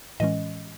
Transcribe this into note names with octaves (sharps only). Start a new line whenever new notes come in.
A2 E3 G#3 C#4 D#5